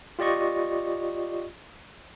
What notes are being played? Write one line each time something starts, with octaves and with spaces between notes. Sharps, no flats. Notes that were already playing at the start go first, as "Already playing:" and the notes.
F4 G4 D5 D#5 C#6